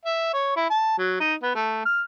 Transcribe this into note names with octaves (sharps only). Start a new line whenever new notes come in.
E5
C#5
E4
A5
F#3
D#4
B3
A3
F6